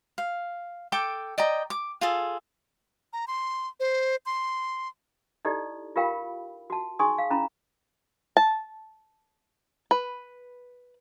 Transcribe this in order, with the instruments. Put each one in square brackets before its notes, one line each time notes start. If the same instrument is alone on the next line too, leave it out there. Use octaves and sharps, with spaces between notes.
[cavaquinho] F5
A4 G5 D6
D5 D#5 G5 A#5
D6
F4 G#4 A4
[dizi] A#5
C6
C5
C6
[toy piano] D#4 E4 G4 A4 D5 D#5
F4 G4 A#4 F5 G5 B5
F#4 A5
D#4 G#4 G#5 C6 C#6 D#6
F5
C#4 E4 A#5 B5
[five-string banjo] A5
B4